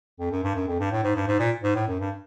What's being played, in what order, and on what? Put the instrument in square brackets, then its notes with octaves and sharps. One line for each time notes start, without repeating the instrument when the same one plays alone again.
[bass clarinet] F2
F#2
G2
F#2
F2
G2
A2
G#2
G2
G#2
A#2
G#2
A2
F#2
G2